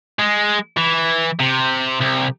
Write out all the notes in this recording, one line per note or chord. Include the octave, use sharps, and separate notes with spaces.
G#3
E3
C3
C2